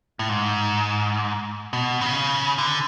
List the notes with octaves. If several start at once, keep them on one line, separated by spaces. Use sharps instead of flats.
A2
G#2
B2
C#3
D3